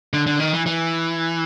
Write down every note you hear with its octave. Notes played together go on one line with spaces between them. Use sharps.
D3
D3
D#3
E3
E3